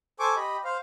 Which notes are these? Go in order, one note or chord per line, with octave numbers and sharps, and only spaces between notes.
A4 C5 G#5 C#6 D6
G4 D#5 B5
C5 F5